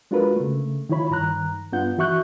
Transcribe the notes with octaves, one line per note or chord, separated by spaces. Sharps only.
G#3 D4 F4 F#4 A#4 B4
C#3 A3
D#3 E4 F4 C#5 B5
G2 D#3 A#5 F#6
G2 B3 D4 F4 F#5 G6
E3 F#4 E5 C#6 F#6 G6